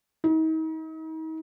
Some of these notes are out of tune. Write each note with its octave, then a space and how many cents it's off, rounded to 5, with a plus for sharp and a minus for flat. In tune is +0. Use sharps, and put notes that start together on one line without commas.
D#4 +40